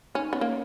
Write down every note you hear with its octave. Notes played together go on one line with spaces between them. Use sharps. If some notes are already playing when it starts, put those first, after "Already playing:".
C#4 D#4
B3 C#4
A#3